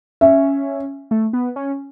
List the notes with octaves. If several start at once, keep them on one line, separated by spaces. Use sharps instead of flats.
C#4 E5
A3
B3
C#4